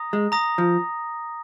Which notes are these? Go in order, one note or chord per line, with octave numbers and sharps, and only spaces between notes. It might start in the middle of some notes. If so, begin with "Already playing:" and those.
Already playing: A#5 D#6 A#6
G#3
A#5 D#6 A#6
F3